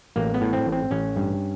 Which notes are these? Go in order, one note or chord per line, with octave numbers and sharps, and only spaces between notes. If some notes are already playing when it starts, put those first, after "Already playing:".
A1 A#3
B3
A2
C4
A1
C4
A1 C#4
G2